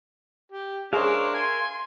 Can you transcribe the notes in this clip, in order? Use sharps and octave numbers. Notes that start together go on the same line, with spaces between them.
G4
D4 G#4 A#4 C5 C#5 E5 F5
G#5 C6